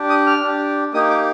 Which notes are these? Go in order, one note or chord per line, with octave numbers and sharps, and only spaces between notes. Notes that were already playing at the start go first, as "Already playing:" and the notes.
Already playing: D4 G4
D#6
F6
D4 G4
A#3 D#4 G4 D#6
D6